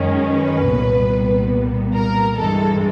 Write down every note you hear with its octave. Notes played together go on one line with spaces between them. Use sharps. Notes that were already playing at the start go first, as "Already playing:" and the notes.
Already playing: F#2 D#3 G#3 C#4
B4
C2 A#2 G3 B3
A#4
G2 E3 G#3 A4